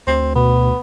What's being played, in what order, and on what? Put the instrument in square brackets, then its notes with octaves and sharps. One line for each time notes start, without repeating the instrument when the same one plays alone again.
[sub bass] D2 [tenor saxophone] C4
[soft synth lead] B2 [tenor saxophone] B3